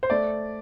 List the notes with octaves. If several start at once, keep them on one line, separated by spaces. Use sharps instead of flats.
C5
A3 D5